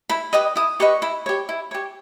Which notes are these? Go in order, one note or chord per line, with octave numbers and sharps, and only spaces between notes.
E4 B5
G4 B4 D#5 D#6
E4 D#6
G4 B4 D#5 C#6
E4 B5
G4 C#5
E4
G4 C#5